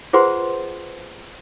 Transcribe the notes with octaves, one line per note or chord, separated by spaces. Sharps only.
F4 G#4 B4 C5 F#5 C6